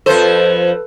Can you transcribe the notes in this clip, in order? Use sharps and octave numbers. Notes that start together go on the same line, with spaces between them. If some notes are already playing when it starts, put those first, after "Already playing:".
F2 F3 A4 B4 C5